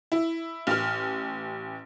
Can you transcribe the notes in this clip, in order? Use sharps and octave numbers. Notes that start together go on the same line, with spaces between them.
E4
A1 F6